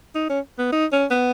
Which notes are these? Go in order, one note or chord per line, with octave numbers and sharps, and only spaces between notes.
D#4
C#4
B3
D#4
C#4
B3